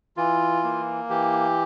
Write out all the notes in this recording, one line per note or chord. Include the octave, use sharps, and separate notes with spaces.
E3 F4
A#3
E3 G4